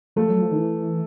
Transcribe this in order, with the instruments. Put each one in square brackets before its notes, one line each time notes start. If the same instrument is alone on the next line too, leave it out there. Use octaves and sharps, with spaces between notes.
[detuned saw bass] F3 [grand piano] A3
[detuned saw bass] F#3
F3
D#3
E3